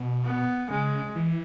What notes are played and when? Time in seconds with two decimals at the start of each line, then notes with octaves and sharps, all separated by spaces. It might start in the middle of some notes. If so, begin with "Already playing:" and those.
Already playing: B2
0.25 B3
0.70 C#3 G#3
1.16 E3